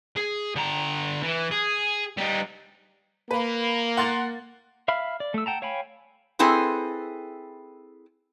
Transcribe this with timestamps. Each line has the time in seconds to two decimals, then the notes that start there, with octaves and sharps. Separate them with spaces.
0.16 G#4
0.56 D3 A#5
1.23 E3
1.51 G#4
2.17 G3 D#4
3.31 A#3 B4
3.97 F#5 C6 A6
4.88 E5 F5 B5 F6
5.20 D5
5.34 A3 E6
5.46 F#5 G5 A5 A#5
5.62 C#5 F5 G5 G#5 B5
6.39 C4 E4 G#4 A4 B4